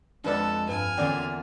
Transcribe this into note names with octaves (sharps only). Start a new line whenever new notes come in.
F2 G#3 D4 A4 B4 D5 F#5
G2 B4 G#5 F6
E2 A#2 D3 C#4 D5 G5 C6